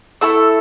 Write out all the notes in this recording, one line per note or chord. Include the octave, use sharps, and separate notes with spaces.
A3 E4 A4 E6